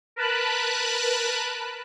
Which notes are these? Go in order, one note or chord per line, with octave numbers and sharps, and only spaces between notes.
A#4 B4 A5 B5 F#6